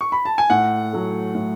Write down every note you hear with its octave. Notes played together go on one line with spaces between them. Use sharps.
C#6
B5
A5
G#5
A2 F#5
F#3 A3
A2